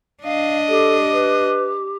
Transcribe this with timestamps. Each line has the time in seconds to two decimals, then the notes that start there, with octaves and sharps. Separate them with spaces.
0.24 D4 D#5 F5
0.68 G4 A4
1.12 B4